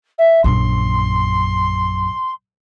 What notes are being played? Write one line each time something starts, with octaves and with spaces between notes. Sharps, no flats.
E5
A#1 F#2 C6